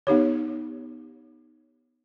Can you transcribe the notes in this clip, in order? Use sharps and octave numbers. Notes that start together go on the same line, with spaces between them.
B3 D#4 G4 C#5